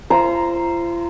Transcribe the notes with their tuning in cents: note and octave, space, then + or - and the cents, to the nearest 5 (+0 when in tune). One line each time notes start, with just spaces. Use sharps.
F4 -40 C5 +0 A#5 +0